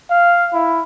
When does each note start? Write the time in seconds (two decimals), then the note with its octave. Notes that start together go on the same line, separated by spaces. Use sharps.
0.10 F5
0.53 E4